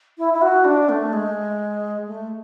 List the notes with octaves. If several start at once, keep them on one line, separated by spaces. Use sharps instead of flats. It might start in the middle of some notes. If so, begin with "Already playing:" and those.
E4
E4
F#4
D4
A3
G#3
A3